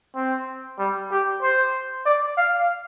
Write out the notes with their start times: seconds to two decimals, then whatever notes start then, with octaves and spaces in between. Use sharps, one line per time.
0.15 C4
0.79 G3
1.11 G4
1.42 C5
2.06 D5
2.38 F5